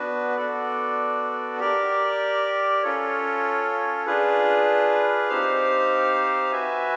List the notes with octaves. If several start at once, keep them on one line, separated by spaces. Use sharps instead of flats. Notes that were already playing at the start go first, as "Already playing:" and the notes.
Already playing: B3 D4 F#4 B4
B3 D4 F#4 A4 D5
G4 A#4 D5
C#4 F4 A4 C#5
D4 F4 G#4 B4
C4 D#4 G4 C5 F5
F#4 B4 E5 G#5